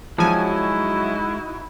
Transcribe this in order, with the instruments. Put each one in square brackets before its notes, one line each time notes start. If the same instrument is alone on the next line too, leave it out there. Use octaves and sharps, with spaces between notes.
[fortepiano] F3 [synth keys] F#3 G#5 [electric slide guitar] G#3 [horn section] D#4 E4 F#4